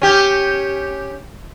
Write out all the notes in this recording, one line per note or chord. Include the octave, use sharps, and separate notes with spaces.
C#4 G4